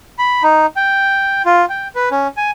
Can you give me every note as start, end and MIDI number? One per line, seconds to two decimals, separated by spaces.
0.19 0.43 83
0.43 0.66 63
0.76 1.42 79
1.46 1.65 65
1.69 1.88 79
1.95 2.09 71
2.11 2.28 61
2.37 2.51 80